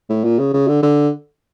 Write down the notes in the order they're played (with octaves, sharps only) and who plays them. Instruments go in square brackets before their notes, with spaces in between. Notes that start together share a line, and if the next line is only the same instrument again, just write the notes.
[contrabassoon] A2
A#2
C#3
C#3
D3
D3